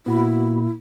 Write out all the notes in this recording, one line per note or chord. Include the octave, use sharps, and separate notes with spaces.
A#2 B3 E4 F#4 B5